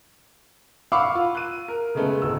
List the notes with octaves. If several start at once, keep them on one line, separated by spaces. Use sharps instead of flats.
F5 F#5 B5 C#6 D6 E6
F4
F#6 D#7
A#4
C#3 G#3 A3 B3
D1 E6